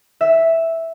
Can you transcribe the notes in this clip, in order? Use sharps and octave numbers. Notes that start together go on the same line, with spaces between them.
E5